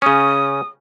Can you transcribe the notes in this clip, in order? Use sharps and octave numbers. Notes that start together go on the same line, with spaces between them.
C#3 C#4 D#6